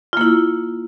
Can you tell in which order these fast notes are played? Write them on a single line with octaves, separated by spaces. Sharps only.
F4 A#3 E4